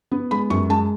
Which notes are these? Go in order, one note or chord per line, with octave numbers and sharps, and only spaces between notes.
B3
G#3 B5
F#2 C#6
G#3 A5